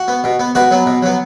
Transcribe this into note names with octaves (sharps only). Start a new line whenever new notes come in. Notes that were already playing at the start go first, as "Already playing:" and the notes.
Already playing: F#4
B3
B2
B3
B2 F#4 B4
F#3 B3
B2
F#3 B3